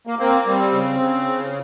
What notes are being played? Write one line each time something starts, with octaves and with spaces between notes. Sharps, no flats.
A#3
A#3 C4
G3 C4
C#3
C#3
C#3